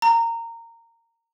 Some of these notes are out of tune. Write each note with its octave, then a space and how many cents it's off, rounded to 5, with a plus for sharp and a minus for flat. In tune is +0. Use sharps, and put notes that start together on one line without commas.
A#5 -20